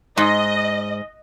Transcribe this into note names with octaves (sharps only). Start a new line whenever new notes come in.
G#2 D#5